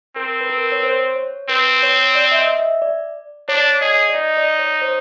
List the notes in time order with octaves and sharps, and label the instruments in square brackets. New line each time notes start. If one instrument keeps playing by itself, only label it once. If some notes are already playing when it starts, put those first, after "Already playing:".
[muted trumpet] C4 [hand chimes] A#4
[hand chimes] B4
A#4
C#5
C5
C#5
[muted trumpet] C4 [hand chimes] B4
[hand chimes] C#5
D5
E5
D#5
E5
D5
[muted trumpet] D4 [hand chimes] C#5
[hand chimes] D5
C#5
[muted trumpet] G#4 [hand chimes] D#5
[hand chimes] D5
[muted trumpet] D#4 [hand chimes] D#5
[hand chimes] D5
C#5
C5